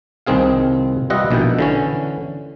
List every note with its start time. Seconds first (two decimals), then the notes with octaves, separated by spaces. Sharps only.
0.27 C2 D#3 C4 G#4 F5
1.10 G3 F4 B4 D#5 E5 F#5
1.31 A#1 B2 D#3 E4 G5
1.59 D3 E3 C#4